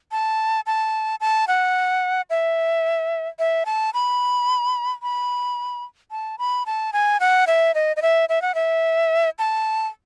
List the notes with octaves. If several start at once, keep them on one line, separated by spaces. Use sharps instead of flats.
A5
A5
A5
F#5
E5
E5
A5
B5
B5
A5
B5
A5
G#5
F#5
E5
D#5
D#5
E5
E5
F#5
E5
A5